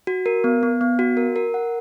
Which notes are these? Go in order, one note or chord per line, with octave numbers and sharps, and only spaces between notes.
F#4
A#4
B3
B3
B3
F#4
A#4
A#4
F#5